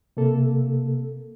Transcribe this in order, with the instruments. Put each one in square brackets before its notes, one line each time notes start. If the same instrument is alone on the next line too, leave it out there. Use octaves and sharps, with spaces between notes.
[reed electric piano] C3 A#3 A4